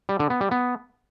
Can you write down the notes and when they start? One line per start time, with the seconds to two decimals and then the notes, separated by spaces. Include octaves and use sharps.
0.09 G3
0.19 D3
0.30 B3
0.41 G3
0.51 B3